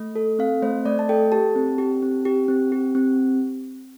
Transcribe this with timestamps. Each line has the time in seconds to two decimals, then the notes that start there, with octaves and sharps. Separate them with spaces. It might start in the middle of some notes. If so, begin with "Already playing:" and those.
Already playing: A3
0.15 A4
0.39 C4 F5
0.62 A3 C5
0.85 A3 D5
0.99 A5
1.09 A4 G5
1.32 G4 A5
1.56 C4
1.78 G4
2.02 C4
2.25 G4
2.48 C4
2.72 G4
2.95 C4